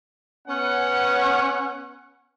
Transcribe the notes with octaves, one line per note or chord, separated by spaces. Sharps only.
B3 C#4 F#5